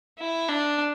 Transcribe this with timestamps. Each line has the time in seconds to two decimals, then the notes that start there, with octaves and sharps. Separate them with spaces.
0.19 E4
0.49 D4